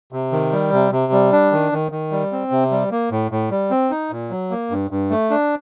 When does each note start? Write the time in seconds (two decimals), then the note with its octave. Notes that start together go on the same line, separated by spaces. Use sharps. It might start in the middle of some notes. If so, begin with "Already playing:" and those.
0.12 C3
0.32 D#3
0.52 G3
0.72 C3
0.92 C3
1.12 G3
1.32 D4
1.52 D#3
1.72 D#3
1.92 D#3
2.12 G3
2.32 C4
2.51 C3
2.71 G3
2.91 A#3
3.11 A2
3.31 A2
3.51 G3
3.71 C4
3.91 D#4
4.11 A#2
4.30 F#3
4.51 A#3
4.71 G2
4.91 G2
5.10 A3
5.30 D4